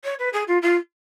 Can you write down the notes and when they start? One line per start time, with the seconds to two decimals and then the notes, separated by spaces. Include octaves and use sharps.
0.04 C#5
0.19 B4
0.33 G#4
0.48 F4
0.62 F4